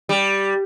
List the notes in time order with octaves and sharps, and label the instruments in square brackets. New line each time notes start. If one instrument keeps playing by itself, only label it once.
[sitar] G3